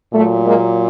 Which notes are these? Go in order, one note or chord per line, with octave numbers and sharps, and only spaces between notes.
A#2 F#3 A3
G#3 A#3